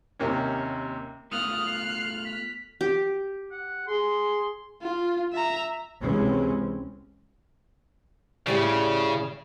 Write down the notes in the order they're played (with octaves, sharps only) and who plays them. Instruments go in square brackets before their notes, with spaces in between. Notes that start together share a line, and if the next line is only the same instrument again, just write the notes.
[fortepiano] D#2 C3 A#3 C#4
[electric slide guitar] A3 B3 F4 [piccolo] D#6 [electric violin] F6 F#6
[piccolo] C7
B6
[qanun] G4
[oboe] F#5
[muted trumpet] G#4 [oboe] C6
[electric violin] F4
E5 A#5
[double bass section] C#2 C3 E3 G#3 C4 C#4
[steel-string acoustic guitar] A2 G4 D5 [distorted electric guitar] C#3